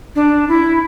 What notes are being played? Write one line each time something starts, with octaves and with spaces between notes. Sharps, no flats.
D4
E4